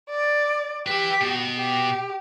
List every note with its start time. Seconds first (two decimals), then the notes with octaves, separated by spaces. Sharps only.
0.10 D5
0.87 G4 B4 E5
1.21 B2
1.57 G4